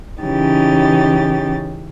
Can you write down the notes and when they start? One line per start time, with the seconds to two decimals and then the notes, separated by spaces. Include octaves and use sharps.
0.22 C#3 E3 C#4 D#4 G4 A6